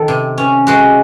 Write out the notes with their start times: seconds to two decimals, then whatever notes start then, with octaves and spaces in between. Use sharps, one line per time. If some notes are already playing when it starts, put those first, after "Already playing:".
Already playing: D#3 A4
0.08 C3
0.38 C#4
0.67 G#3 F#4